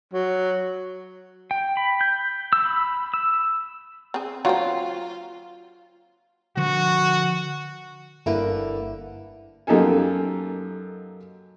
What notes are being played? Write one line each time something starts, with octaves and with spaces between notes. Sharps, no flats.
F#3
G5
B5
G6
E6
B5
E6
C4 G#4
F#3 A#3 C4 F4
D3 F3 F#4
G1 D3 A#3 E4 B4
F#2 A#3 D#4 G4 A4 G#5